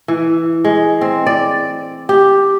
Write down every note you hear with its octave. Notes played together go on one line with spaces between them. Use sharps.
E3
G#3
C4
D5
G4